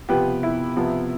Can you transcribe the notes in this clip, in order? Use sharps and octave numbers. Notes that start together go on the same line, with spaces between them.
C3 F3 B3 G4 B4
E4
C3 F3 B3